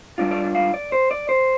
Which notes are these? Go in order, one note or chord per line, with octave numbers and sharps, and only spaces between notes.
G2 G3 D4 F4 D5
D5
D5
F5
D5
C5
D5
C5